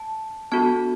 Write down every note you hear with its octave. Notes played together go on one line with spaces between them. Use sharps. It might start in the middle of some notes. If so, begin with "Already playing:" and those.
Already playing: A5
B3 D4 F#4 A4 A5